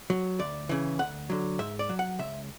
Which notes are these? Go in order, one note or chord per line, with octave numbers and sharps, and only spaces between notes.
F#3
D2 D5
C#3 E3
D2 F#5
D3 F#3
G#2 E5
D5
F#3
F#5
C#2 E5